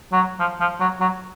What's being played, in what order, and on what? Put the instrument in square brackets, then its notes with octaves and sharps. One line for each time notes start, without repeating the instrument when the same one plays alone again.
[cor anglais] F#3
F3
F3
F#3
F#3